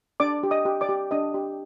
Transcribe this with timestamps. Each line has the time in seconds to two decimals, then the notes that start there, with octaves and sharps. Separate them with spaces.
0.20 D4 D5 D6
0.43 G4
0.51 D#5 D#6
0.65 G4
0.81 D5 D6
0.89 G4
1.11 D4 D#5 D#6
1.34 G4